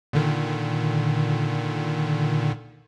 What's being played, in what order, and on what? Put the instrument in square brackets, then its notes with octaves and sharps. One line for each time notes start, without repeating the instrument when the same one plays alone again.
[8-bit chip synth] A#2 D3 D#3